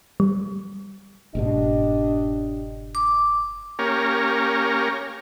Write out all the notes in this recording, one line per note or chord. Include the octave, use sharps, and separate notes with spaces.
G3
F#1 G#2 B2 D4 G4 D#5
D6
A#3 C#4 G4 A#4 C#5